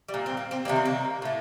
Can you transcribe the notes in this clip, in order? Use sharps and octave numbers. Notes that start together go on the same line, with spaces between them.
G3
A#2
C4
A#3
C4
C3 D#3 G3 A#3
C4
A#3
A2 A3